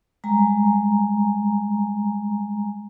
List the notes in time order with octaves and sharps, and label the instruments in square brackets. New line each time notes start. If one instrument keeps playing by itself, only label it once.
[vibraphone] G3 G#3 G#5 A#5